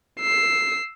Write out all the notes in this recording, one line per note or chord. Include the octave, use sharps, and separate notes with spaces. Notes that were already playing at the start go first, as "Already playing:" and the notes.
E6 C7